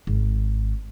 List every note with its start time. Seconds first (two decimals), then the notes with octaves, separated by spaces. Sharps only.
0.07 G#1